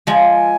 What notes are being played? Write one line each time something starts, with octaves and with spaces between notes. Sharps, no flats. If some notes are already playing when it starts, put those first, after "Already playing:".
F3 G#3 G#5